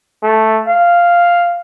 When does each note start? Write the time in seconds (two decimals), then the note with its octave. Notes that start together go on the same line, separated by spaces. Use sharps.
0.23 A3
0.68 F5